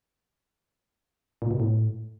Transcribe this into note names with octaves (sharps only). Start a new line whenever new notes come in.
A#2
B2
A2